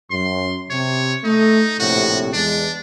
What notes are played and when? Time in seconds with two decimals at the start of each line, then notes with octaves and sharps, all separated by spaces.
0.10 F#2 C6
0.70 C3 C#5
1.24 A3 D#4
1.80 A#1 A2 C3 F#4
2.33 E2 G#3 D4